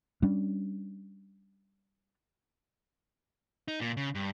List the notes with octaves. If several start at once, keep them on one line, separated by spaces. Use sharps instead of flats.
G3 C#4 D4
D#4
A#2
C#3
G2